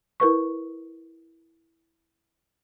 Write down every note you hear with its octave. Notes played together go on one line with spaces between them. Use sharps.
E4 A#4 B4 C#6